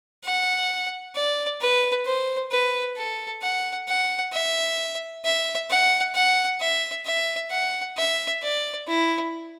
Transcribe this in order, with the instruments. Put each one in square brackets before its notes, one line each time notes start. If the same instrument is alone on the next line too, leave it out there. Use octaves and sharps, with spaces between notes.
[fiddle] F#5
D5
B4
C5
B4
A4
F#5
F#5
E5
E5
F#5
F#5
E5
E5
F#5
E5
D5
E4